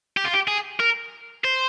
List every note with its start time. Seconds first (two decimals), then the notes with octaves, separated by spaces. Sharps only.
0.17 G4
0.25 F4
0.34 G4
0.48 G#4
0.80 A#4
1.44 C5